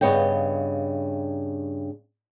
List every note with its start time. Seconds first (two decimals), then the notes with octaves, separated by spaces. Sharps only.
0.01 G2 C#3 B3 C#5 D#5 G5